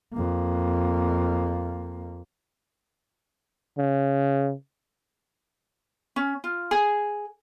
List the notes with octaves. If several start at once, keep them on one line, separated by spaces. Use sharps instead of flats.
F2 A#3
C#3
C#4
F4
G#4